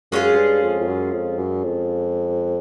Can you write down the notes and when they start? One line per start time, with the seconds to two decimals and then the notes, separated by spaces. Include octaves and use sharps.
0.12 F#2 G#3 C#4 F4 G#4
0.33 F#2
0.37 G2
0.63 F2
0.80 F2
0.88 F#2
1.13 F2
1.38 F#2
1.64 F2